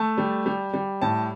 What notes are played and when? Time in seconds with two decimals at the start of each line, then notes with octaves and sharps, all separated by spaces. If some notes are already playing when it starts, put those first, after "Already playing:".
Already playing: A3 A5
0.18 G3
0.46 G3
0.74 G3
1.01 A2 A5